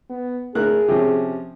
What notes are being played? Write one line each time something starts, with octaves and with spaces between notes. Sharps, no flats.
B3
A2 G#4 A#4 F#6
C3 F3 C#4